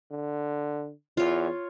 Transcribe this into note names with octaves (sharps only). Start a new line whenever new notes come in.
D3
E2 F4 C#5